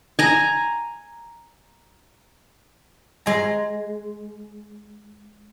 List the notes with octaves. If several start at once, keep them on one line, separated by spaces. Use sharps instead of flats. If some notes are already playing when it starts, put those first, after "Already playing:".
G#5 A#5
G#3 A#5